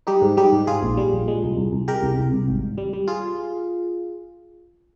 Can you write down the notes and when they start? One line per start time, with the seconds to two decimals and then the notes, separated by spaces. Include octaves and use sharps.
0.07 G3 D#4 G4
0.22 G#2
0.37 G3 D#4 G4
0.52 G#2
0.67 G#2 F4 G#4
0.83 A#1
0.97 G3
1.13 A#1
1.28 G#3
1.43 C2
1.57 C2
1.73 C2
1.88 G#3 G4 A#4
2.02 C2
2.18 C2
2.33 C2
2.48 G#1
2.63 G#1
2.78 G3
2.93 G3
3.08 F4 G#4